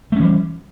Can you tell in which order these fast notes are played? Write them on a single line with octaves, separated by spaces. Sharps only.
A3 C#4 E3 G3